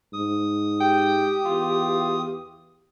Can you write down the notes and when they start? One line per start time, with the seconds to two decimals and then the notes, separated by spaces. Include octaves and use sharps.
0.13 G#2 D#6
0.80 G4 G5
1.45 E2 F4